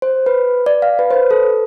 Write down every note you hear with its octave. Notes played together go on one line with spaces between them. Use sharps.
C5
B4
D5
F5
B4
C5
B4
A4